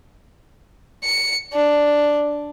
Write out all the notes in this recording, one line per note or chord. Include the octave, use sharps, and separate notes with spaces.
C#7
D4